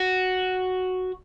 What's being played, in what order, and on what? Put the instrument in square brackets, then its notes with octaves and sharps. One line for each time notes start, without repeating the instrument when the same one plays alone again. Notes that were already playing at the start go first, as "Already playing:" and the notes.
Already playing: [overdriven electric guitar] F#4